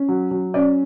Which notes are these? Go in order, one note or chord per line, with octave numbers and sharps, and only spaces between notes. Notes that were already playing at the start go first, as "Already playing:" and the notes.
Already playing: C#4
F#3
F#3
C#4 D5